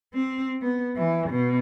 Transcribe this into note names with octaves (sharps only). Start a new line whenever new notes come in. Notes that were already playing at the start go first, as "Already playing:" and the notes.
C4
B3
E3
B2